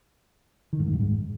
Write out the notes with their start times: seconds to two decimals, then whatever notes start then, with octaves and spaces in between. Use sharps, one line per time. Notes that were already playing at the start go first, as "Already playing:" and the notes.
0.73 D#3
0.80 G#2
0.86 G2
0.93 F#2
1.00 G#2